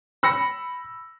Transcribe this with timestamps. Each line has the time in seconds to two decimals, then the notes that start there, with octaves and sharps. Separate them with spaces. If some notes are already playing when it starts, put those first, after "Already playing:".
0.23 B5 E6 A#6 C#7